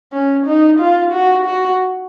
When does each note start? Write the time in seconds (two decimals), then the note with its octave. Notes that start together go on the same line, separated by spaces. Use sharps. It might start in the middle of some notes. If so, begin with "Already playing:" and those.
0.13 C#4
0.46 D#4
0.79 F4
1.12 F#4
1.45 F#4